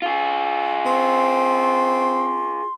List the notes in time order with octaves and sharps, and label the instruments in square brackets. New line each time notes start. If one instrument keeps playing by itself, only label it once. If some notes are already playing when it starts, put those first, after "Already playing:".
[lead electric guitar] F4 G#4
[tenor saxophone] C4 [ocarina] C6